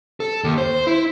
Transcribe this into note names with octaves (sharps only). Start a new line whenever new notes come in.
A4
D#2
C5
E4